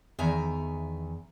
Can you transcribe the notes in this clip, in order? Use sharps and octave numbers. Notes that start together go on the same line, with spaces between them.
E2 D#3 E5 G#5 A#5